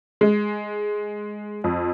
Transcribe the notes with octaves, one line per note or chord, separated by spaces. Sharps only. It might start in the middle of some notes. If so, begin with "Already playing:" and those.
G#3
F2